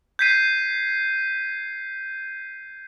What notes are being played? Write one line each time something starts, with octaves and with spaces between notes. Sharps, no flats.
G6 G#6 B6 C7 D#7